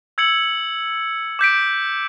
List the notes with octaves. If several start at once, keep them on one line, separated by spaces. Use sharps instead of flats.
E6 G#6 C#7 F#7
D6 G6 B6 D7